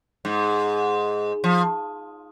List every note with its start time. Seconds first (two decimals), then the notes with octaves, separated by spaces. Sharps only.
0.25 G#2
1.44 F3